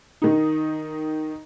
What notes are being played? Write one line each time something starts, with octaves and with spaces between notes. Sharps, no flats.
D#3 D#4